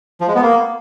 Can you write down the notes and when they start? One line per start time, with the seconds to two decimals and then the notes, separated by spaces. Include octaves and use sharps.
0.21 F3
0.28 G#3
0.35 B3
0.42 A#3